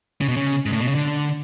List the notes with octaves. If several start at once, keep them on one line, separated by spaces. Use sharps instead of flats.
C#3
B2
C#3
G#2
A2
B2
C#3
D3